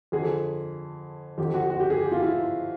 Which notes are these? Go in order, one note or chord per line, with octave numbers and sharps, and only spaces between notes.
F2 D3 G#4
F2 D3 G4
F#4
F#4
G4
G#4
G4
F4
E4